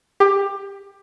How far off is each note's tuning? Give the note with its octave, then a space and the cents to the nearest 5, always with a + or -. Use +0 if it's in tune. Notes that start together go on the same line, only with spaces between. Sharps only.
G4 +20